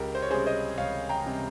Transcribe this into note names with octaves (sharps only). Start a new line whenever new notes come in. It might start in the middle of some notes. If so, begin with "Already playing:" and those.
Already playing: C#2 G4 A#4
C5
C#5
C3 G3 C#4 G#4 C5
C5 D#5
C#2 C#5 F5
G5 A#5
C3 G3 C#4